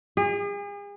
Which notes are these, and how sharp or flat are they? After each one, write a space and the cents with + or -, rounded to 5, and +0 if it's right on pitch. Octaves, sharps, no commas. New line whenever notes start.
G#4 -40